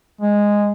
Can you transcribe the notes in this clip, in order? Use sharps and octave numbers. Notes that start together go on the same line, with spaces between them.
G#3